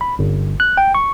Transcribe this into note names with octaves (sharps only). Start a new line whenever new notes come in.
B5
G1
F#6
G5
C#6